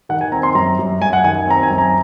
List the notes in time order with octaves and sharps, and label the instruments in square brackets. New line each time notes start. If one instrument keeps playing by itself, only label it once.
[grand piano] D#3 F#5
G#5
C4 A#5
C6
F#2 A#5
F#2
F#2 G#5
F#5
D#3 G#5
C4 A#5
G#5
F#2
A#5